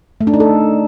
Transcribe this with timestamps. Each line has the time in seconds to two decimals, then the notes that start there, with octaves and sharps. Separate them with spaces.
0.21 A3
0.27 D4
0.34 D#4
0.40 A4